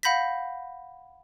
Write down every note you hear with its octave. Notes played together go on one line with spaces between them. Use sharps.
F5 F#5 B5 G6 A#6 B6